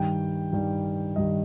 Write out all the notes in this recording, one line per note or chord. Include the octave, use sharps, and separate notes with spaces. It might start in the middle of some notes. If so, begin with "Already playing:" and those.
Already playing: G2 D#3 G3 G5
G2 D#3 G3
G2 D#3 G3 D#5